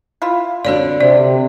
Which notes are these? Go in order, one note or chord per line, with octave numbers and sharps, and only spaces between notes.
E4 F4
D3 C4 D4 F#4 C#5 D5
C3 D5